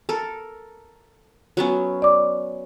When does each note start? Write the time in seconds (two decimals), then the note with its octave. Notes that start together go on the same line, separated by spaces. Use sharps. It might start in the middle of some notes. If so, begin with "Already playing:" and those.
0.09 A4 A#4
1.57 F#3 B3 C#4
2.02 D5 D6